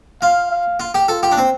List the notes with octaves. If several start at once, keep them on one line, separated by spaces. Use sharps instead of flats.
F4 F5
F5
F4
G4
F4 A4
G4
D4
C4